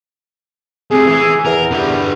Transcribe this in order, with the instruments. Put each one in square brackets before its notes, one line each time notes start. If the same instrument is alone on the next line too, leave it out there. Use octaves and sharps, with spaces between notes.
[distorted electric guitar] C3 A3 [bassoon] G#4
[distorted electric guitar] E3
[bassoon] E2 [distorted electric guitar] A#4
[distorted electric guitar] D3 G3